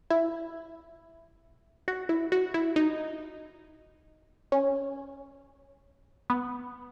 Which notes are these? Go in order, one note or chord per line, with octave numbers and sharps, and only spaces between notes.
E4
F#4
E4
F#4
E4
D#4
C#4
B3